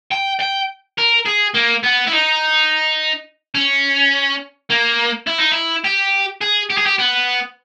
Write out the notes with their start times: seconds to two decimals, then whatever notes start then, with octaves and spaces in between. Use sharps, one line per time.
0.11 G5
0.40 G5
0.98 A#4
1.26 G#4
1.54 A#3
1.83 B3
2.07 E4
2.12 D#4
3.55 C#4
4.70 A#3
5.27 E4
5.38 D#4
5.52 E4
5.84 G4
6.41 G#4
6.70 G4
6.78 G#4
6.86 G4
6.99 B3